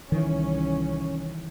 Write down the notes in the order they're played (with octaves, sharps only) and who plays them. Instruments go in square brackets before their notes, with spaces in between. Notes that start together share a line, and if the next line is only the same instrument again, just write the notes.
[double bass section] C2 C#4 [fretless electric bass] D#3 E3